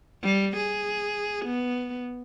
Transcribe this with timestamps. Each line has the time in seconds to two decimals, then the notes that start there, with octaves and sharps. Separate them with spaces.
0.23 G3
0.57 G#4
1.46 B3